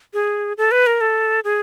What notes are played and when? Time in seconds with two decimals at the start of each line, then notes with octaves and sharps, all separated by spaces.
0.14 G#4
0.58 A4
0.71 B4
0.87 A#4
1.01 A4
1.44 G#4